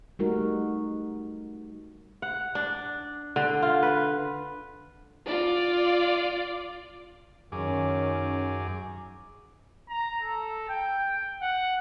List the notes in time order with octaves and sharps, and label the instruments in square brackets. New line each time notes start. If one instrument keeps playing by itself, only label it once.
[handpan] G3 A3 D#4 F#4 A#4
[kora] F#5
D4
D3
F4
B4
[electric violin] F4 D5
[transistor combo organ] F#2 G#4 D6 [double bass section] D#3 C#4
[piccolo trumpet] A#5
A4
G5
F#5